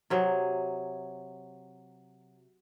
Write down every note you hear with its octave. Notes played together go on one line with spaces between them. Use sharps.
C3 F#3 G#4